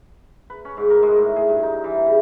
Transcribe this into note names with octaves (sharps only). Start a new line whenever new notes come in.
B4
C#4
G#2
A#4
G#3
A2
G#4
G2
D#4
E3
C#3